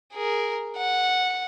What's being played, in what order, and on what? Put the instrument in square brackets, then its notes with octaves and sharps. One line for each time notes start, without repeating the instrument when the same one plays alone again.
[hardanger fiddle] G#4 A#4
F#5